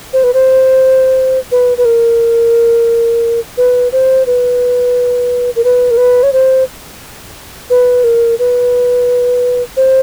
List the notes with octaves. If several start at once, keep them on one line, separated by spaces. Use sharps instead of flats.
C5
B4
C5
B4
B4
A#4
B4
C5
B4
A#4
B4
A#4
B4
C#5
C5
B4
A#4
B4
C5